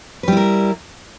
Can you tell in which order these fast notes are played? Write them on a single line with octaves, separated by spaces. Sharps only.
B4 G3 E4 A#4